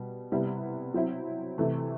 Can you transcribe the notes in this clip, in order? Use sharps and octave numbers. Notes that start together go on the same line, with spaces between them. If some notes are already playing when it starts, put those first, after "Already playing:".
Already playing: B2 G3
C3 G3 B3 E4
F#3 C4 E4
C3 E3 A3